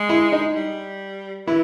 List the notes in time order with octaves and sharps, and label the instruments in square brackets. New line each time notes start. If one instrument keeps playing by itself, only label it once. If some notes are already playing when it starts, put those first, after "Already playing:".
Already playing: [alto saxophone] G#3
[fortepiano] E4
D#4
[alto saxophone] G3
[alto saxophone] E3 [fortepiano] E4